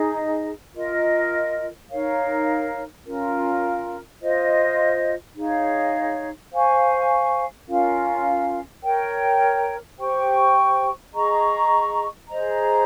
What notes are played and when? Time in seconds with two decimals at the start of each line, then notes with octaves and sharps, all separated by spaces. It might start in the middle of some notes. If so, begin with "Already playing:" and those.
Already playing: D#4 G#4 D#5
0.74 F4 A#4 D#5
1.90 D#4 A#4 C#5 F5
3.05 C#4 F4 A#4
4.21 F4 C5 D#5
5.36 D#4 G#4 C#5 F5
6.51 C5 F5 G#5 C#6
7.67 C#4 F4 A#4 F5
8.83 A#4 C#5 G5
9.98 G4 C5 G5 C#6
11.13 G#4 D#5 A#5 C#6
12.29 G#4 C5 D#5 A#5